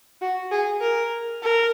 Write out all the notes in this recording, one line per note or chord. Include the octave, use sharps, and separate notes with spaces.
F#4
G#4
A#4
A#4